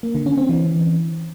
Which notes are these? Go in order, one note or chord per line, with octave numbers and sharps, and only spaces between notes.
A#3
D3
C#4
C4
E3